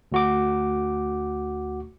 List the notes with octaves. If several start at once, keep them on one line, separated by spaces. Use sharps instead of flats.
D2 F#4 D6